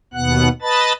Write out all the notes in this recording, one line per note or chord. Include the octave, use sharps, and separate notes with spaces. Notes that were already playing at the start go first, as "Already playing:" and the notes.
D#2 B2 B3 F#5 F#6
B4 D#5 A5 B5 A6